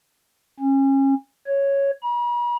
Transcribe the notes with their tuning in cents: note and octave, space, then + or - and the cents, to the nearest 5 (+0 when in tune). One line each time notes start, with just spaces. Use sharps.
C#4 -30
C#5 +0
B5 -45